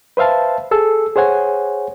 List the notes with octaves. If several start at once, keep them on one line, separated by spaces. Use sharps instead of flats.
B4 C5 E5 F5 A5
G#4 A4 E6
G#4 C5 C#5 F#5 G#5